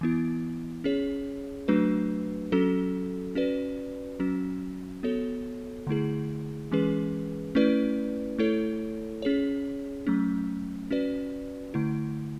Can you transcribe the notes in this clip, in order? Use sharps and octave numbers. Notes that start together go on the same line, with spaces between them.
E3 B3 E4
C#4 G#4 C#5
F#3 A3 D4 F#4 B4
F#3 C#4 F#4 A4
C#4 F#4 B4 D5
F#3 C#4 F#4
B3 F#4 A4 C#5
D3 A3 E4 G#4
E3 G#3 C#4 G#4 B4
A3 C#4 E4 B4 D5
A3 E4 A4 C#5
C#4 G#4 C#5
F#3 A3 C#4
C#4 F#4 B4 D5
D3 A3 E4